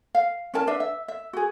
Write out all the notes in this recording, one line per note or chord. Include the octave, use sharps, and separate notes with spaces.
F5
C#4 E4 A#4 A5
D4 B4 E5
E5
E5
F#4 G#4